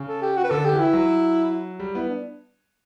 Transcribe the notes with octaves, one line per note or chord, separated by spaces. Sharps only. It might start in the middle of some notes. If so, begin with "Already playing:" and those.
Already playing: C#3
A4
G4
F#4
B4
D3 A4
G4
E3
E4
F#3
G3
B3 E4
D4